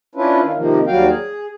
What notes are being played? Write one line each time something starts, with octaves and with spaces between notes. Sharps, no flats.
C#4 D4 E4 F4 B4
D#3 F4
C3 D#3 F3 A#3
D#2 F#3 G3 F#4 F5 G5
G#4